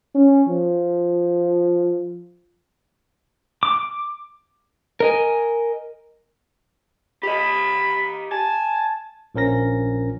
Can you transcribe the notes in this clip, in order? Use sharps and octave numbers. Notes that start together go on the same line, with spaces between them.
C#4
F3
D6
A#4 D#5 G#5
G4 D#5 B5
G#5 A5
A#1 F3 C#4 A#4 A#6